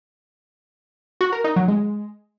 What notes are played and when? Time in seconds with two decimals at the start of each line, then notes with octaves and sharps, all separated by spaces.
1.21 F#4
1.32 A#4
1.44 D#4
1.56 F#3
1.68 G#3